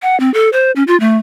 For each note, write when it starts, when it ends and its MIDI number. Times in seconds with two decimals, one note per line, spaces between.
0.02 0.18 78
0.20 0.32 60
0.34 0.49 69
0.53 0.71 72
0.76 0.83 61
0.88 0.98 65
1.00 1.17 57